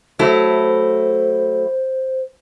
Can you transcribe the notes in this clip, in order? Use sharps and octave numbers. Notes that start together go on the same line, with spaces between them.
F#3 A3 E4 C5